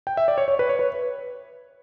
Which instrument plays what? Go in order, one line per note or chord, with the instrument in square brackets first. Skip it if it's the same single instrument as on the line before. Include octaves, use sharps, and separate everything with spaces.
[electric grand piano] G5
E5
D5
C#5
C#5
B4
C#5
B4